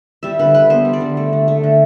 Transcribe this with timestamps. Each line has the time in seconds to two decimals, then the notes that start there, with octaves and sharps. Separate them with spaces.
0.23 G3 E5
0.39 D3 B4
0.54 D3 B4
0.70 B3 C5
0.85 G3
0.93 D5
1.01 D3
1.17 A3
1.33 D3
1.48 A3
1.63 D3